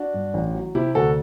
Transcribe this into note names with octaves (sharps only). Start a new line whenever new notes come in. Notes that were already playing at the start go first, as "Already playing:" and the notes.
Already playing: D4 F#4
G2
A1
F#3
C3 E4 G4
D2 F#4 A4